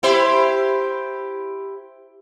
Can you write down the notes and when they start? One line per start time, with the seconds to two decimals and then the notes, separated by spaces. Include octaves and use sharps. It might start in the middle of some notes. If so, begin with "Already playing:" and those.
0.03 E4 G4 C5